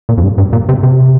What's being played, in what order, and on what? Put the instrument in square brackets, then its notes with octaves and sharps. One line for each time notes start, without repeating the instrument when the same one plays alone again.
[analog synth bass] A#2
F2
G2
G2
A#2
C3
C3